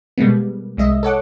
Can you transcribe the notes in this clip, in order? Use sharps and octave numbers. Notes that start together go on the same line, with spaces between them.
B2 G3 G#3 A#3 B3
C2 G#3 D#5 E5
A4 C#5 F#5 D6